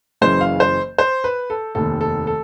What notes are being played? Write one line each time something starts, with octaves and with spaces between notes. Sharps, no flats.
F#1 F#2 C#3 E3 C5
F5
C5
C5
B4
A4
F1 D#2 D#3 A4
A4
A4